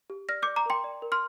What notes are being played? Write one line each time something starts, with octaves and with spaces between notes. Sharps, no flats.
G4
D5 F6 A#6
D5 D6 G6
A#5 D6
A#4 G5 C6
D5
A#4
C6 F6